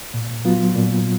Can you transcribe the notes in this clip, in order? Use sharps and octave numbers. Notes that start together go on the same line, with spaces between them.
A#2
F#3 B3 F4
A#2